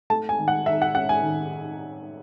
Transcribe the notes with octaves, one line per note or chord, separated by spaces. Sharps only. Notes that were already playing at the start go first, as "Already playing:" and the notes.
A3 A5
G#5
D#3
F#5
D#3 E5
F#5
C#4 F#5
G#5
D#3